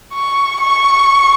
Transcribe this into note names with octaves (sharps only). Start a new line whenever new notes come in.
C#6
C#6